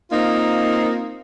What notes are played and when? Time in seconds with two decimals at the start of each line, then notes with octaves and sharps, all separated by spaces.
0.12 A#3 C4 D#4 F4